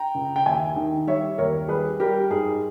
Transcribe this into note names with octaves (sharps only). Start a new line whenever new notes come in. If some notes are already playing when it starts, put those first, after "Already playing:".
Already playing: G5 A#5
C#2
G5
D#2 E5 G#5
D#3
G3 C#5 E5
D#2 A#4 C#5
G3 G#4 B4
G3 G4 A#4
G#2 G#4